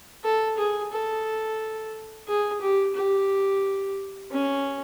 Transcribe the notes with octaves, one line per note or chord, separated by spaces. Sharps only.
A4
G#4
A4
G#4
G4
G4
C#4